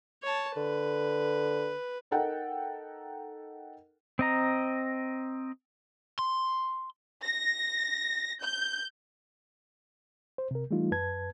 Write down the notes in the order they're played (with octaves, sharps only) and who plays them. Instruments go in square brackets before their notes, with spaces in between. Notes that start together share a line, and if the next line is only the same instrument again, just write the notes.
[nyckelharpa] C#5 A5
[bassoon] D3 [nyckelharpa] B4
[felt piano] D#4 A4 A#4 F#5 G5
[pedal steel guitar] C4 D#5 A#5
[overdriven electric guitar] C6
[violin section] A#6
G6
[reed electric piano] C5
C3 A#4
E3 G3 A3 D#4 F4
F#2 B4 A5 G#6